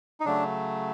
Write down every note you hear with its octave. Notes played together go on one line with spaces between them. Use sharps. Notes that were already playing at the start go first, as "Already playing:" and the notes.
D#4
C#3 F#3 A3 D4